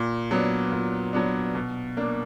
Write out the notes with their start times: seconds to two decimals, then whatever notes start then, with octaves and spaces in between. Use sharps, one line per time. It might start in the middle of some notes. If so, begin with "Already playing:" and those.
Already playing: A#2
0.31 F#3 B3 D4
0.72 A#2
1.13 F#3 B3 D4
1.55 B2
1.97 A#3 D4